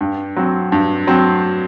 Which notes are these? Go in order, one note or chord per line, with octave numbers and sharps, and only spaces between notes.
G2
F#3 C4
G2
F#3 C4